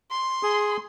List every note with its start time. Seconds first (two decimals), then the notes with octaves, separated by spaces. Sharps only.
0.11 C6
0.43 G#4